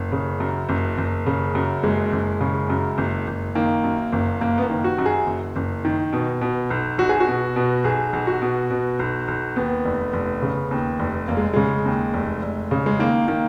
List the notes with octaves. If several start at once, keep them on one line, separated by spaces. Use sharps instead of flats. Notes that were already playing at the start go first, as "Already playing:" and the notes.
Already playing: F#1
C#3
F#2
F#1
F#1
C#3
F#2
F#1 G#3
F#1
C#3
F#2
F#1
F#1
D#3 A#3
F#2
F#1
F#1 A#3
B3
A#3
D#3
F#4
F#2
G#4
F#1
F#1
D#3
B2
B2
B1
B1 F#4
G#4
F#4
B2
B2
B1 G#4
B1
F#4
B2
B2
B1
B1
D#2 B3
F1
F1
C#3
D#2
F1
F1 A#3
G#3
C#3 G#3
D#2
F1
F1
C#3
G#3
D#3 A#3
D#3 A#3